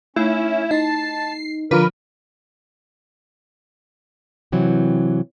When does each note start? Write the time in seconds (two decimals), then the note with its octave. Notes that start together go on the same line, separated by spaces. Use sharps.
0.16 A3 C#4 D#4 E4
0.71 D#4 E4 D#5 A5 C7
1.71 D3 F3 F4 A#4 B4 D6
4.52 C3 E3 F#3 C4